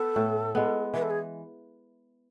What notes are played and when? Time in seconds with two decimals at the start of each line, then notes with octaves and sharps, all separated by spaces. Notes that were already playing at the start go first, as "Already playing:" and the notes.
Already playing: B3 A4
0.16 A2
0.55 G#3 B3
0.94 E3 B4
1.02 A4
1.10 G#4